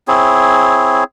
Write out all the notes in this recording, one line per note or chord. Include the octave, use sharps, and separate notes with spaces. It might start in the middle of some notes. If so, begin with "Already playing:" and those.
C4 E4 G#4 C#5